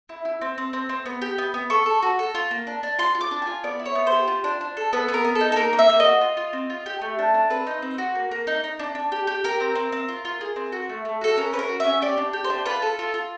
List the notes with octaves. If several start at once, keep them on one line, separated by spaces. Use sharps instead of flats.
E4
E4
C4
C4
C4
C4
B3
G4
B3
B3
A4 C#6
A4
F#4
A4
F4
A#3
D4
D4
F4 C6
F4
D6
D4
F4 G#5
B3 D5
E4
C#5
B3
C5
G4
F4
D4
D4
A4
B3 B4
B3
A#4
B3
A4
D#4
A4
A#3 A#4
A#3
E5
A#3
F#4 D#5
F4
F4
C4
F4
G4
A3
D4
D4
C4 B4
D#4
C4
F#4
A#3
A#3
D#4
D#4
D4
D4
G4
G4
G4 A#4
C4
C4
C4
F4
F4
G#4
C4
F#4
A3
A3
F#4 A4
C#4 A#4
C#4 B4
A#4
F#4
E5
C#4
G4 D5
D4
G4
C5
D4
F4 B4
A4
F4
F4